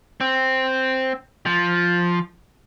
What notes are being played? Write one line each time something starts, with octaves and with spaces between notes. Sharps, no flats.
C4
F3